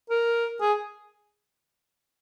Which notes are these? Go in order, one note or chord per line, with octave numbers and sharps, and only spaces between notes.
A#4
G#4